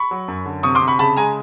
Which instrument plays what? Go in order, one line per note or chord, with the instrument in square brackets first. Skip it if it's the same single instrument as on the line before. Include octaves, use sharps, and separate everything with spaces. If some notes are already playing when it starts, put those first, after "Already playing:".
Already playing: [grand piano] B5 C#6
F#3
F#2
D3
C3 C#6 D#6
C6 D6
C3
B5 C#6
C#3 A5 B5
G#3 G#5 A#5